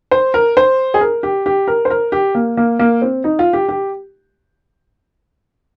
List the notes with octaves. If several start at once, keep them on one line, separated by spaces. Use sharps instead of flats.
C5
A#4
C5
G#4
A#4
G4
G4
A#4
C5
A#4
G4
A#3
A#3
A#3
C4
D#4
F4
G4
G4